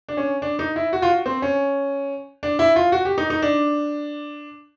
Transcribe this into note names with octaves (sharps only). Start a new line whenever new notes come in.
D4
C#4
D4
D#4
E4
F#4
F4
F#4
C4
C#4
D4
E4
F4
F#4
G4
D#4
D#4
D4